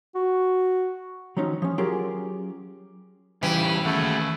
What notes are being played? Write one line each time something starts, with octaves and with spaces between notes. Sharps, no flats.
F#4
D#3 F3 F#3 C#4 D#4
F3 C#4
F#3 C#4 F4 G4 G#4 A#4
C#3 E3 G3 G4
D#2 A3 C#4 G#4 F#5